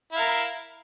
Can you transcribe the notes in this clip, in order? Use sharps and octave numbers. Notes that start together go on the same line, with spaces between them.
E4 A#4 F5